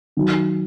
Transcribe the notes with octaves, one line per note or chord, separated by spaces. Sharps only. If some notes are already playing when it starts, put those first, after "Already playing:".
D#3 F#3